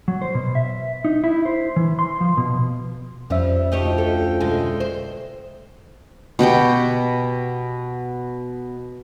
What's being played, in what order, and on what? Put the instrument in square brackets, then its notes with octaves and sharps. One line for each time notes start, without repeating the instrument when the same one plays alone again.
[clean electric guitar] F#3
C5
B2
E5
D#4
E4
C5
E3
C6
F3
B2
[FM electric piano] F2 C#4 E5 [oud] F3 G3
[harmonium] D2 F3 G5 [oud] D#4 G4 C#5
[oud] A4
B2 D3 G#3
C5
[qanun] B2 F#4 G4 G5